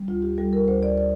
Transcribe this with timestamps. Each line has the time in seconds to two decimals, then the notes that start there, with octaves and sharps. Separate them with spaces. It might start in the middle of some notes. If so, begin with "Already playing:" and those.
Already playing: G3
0.08 D2 F4
0.22 G4
0.38 G3 A4
0.53 A#4
0.68 D2 C5
0.83 D5
0.98 D5